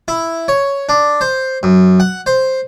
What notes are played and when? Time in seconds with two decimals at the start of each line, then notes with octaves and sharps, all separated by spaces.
0.08 E4
0.48 C#5
0.89 D4
1.21 C5
1.63 F#2
2.00 F#5
2.26 C5